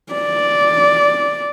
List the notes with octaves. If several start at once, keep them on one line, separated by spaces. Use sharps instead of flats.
D5